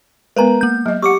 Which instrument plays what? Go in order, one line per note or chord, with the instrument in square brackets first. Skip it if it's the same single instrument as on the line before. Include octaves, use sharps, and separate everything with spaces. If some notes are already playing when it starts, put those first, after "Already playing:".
[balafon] G#3 B3 [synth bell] A#4 B4 A#5
[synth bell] A#3 G6
[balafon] F#3 D#5
[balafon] G4 F#5 [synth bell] C#6 D6 C#7